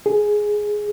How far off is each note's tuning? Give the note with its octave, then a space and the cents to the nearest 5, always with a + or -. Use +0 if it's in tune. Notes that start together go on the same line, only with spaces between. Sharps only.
G#4 +5